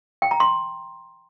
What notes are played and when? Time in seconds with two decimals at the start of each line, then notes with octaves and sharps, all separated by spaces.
0.22 G5
0.31 A#5
0.40 C6